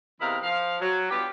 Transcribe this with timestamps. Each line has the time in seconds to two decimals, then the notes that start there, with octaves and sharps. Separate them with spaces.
0.21 E2 C3 E4 A#4 D#5 F5
0.44 F3 F5
0.81 F#3
1.11 G2 B3 F4 G4